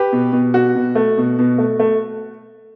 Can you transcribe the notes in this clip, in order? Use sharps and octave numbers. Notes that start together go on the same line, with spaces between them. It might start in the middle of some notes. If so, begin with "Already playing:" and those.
Already playing: G4 B4
B2
B2
B2 F#4
B2
A3
B2
B2
A3
A3